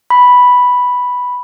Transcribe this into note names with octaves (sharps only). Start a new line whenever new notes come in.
B5